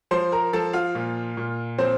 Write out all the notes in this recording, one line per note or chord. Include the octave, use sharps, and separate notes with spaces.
F3 C5 C6
A#4 A#5
F3 A4 A5
F4 F5
A#2
A#2
F3 C4 C5